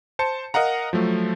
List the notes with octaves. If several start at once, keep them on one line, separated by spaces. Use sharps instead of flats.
C5 A5 C#7
A#4 D#5 F5 F#5 A#5
F3 F#3 A3